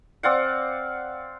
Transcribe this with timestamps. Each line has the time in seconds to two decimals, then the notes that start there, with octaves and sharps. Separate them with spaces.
0.23 C4 D5 F5 F#5